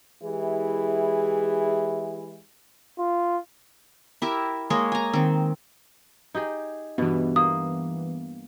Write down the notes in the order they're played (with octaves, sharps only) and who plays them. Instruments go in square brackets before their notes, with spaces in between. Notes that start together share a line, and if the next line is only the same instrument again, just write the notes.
[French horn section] E3 G#3 E4 G4 G#4
[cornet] F4
[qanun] E4 G4 A#4 E5
G#3 A#3 C#5 D#5
G#5 A#5
D#3 C4
[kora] D#4 G4 G#4
[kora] G2 B2 [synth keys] E3 B3
[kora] A#3 [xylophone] D#6